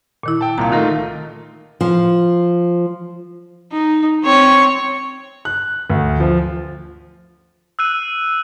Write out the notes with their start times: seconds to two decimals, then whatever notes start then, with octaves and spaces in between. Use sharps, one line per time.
0.23 A#2 D#3 E4
0.41 G5 A5
0.58 C2 A#2 F5 A#5
0.72 D#3 A3 D#4 F4 A#4
1.81 F3
3.73 D#4
4.24 C4 C#5
5.45 F#6
5.90 D2
6.20 F3
7.79 E6 F#6 D#7